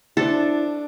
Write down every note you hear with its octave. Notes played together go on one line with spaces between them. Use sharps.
D4 E4 A4 C5